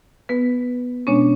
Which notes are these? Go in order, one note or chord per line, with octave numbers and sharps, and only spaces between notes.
B3 B4
B2 G#3 B3 C#4 D4 C#5